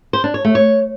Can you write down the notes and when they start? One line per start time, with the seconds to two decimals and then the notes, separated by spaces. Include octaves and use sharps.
0.13 C5
0.24 D4
0.34 C#5
0.45 A3
0.55 C#5